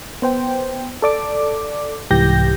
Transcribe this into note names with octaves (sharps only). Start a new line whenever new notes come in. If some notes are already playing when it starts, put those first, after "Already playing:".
B3 C5 G5
A4 D5 D6
C2 G#2 E3 G4 G6 A#6